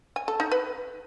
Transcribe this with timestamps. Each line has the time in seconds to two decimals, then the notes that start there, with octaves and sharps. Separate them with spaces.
0.16 G#5
0.28 A4
0.40 D#4
0.52 B4